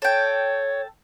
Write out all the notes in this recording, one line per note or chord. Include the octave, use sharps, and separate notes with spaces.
A4 C#5 G5